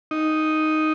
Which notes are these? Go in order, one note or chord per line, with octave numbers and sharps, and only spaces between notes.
D#4